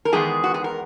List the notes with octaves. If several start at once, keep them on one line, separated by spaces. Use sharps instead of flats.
A#4
E2 D#3 G#3 B3 G#4
F#4
G#4
A#4